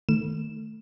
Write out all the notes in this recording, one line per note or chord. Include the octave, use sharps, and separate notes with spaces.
D#3 A3 E7